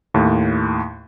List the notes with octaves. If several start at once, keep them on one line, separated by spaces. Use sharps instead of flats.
D#2 A2